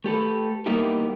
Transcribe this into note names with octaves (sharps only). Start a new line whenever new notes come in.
A3 G4 A4 B4
G3 A#3 B3 D#4 E4 G4